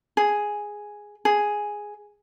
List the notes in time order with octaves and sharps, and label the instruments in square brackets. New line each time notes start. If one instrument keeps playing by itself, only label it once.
[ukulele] G#4
G#4